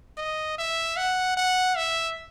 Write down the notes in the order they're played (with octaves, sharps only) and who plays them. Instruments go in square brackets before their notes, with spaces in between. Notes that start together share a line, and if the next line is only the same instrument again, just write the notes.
[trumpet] D#5
E5
F#5
F#5
E5